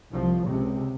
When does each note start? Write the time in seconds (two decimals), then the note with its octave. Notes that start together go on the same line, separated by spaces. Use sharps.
0.12 C2 F3
0.46 C#2 C3